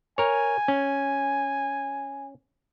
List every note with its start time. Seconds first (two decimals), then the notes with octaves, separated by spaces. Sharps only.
0.18 A#4 C#5 G#5
0.68 C#4